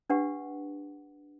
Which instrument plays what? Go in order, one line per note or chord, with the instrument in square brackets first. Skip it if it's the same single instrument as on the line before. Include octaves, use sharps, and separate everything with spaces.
[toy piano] D4 G4 B4 F#5